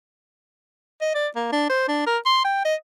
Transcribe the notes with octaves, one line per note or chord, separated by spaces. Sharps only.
D#5
D5
A#3
D4
C5
D4
A#4
C6
G5
D#5